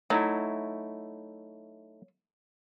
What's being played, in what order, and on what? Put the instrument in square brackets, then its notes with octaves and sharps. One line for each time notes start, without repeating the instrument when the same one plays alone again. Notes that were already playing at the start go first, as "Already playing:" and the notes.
[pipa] F#3 [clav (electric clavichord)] A3 D#4 E4